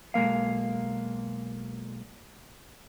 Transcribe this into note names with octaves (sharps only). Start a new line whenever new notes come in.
B1 G#3 A#3 F5